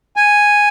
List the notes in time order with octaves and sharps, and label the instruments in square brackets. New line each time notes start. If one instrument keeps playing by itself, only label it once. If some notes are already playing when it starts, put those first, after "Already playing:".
[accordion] G#5